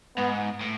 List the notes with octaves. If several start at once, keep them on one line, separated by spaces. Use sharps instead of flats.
G#2 B3
A2